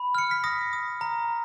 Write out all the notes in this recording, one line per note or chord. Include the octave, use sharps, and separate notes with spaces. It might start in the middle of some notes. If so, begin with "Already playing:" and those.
Already playing: B5
F6 C#7
B6
D#6 A#6
D#6
A#5